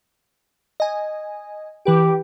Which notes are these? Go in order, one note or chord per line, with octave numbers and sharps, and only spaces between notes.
D#5 G#5
E3 G4 B4 D7